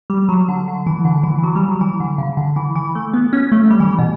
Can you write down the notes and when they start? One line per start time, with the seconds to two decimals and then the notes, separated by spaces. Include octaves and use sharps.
0.10 G3
0.29 F#3
0.48 D3
0.68 D3
0.86 E3
1.05 D3
1.23 E3
1.38 E3
1.43 F#3
1.55 G3
1.68 F#3
1.81 E3
2.00 D3
2.18 C#3
2.37 D3
2.56 E3
2.76 E3
2.95 A3
3.13 B3
3.33 C#4
3.52 A3
3.70 G3
3.80 E3
3.99 B2